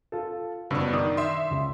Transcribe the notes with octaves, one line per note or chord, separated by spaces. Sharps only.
F4 A4
F#1 G2 B2 D4 B4 E6
D#3 D5 D6 D#6
E5 C6
C#2